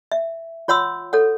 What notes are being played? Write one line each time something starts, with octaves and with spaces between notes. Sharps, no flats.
E5
F4 C#5 F#5 C6 E6
A4 C#5 F#5